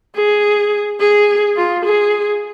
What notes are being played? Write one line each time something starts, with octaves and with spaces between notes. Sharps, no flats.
G#4
G#4
F4
G#4